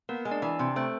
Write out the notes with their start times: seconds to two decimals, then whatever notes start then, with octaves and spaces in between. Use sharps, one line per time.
0.09 A#3 B3 A#4
0.25 G#3
0.31 D4 D5
0.42 E3 D4 D5
0.59 C3
0.76 A3 C4 C5